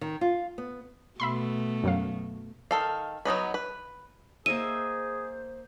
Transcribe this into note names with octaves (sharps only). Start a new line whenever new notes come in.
D#3
F4
B3
B2 A3 E5 B5 C6
F#2 F#3 F5
D#3 A4 F5
F#3 B3 D#4 B4
B4
A#3 G#4 C5 D#5 E5 D#7